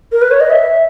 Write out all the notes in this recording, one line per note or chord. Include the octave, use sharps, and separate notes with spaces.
A#4
B4
C#5
D#5
E5